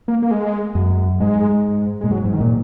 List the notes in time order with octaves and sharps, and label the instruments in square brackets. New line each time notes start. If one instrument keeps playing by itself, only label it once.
[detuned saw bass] A#3
A#3
G#3
[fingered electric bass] F#2
[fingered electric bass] G#2 [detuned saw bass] G#3
[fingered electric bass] A#2 [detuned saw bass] G#3
[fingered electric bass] G#2 [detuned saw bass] F#3
[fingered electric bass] G#2
[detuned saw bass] D#3
[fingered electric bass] A#2